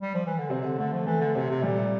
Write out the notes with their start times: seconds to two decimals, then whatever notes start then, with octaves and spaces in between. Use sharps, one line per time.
0.02 G3
0.14 F3
0.27 E3
0.38 D3
0.50 C3 C4
0.64 D3
0.78 D3 A3
0.93 F3
1.06 E3 A3
1.21 D3
1.35 C3 C4
1.50 C3
1.63 A#2 G3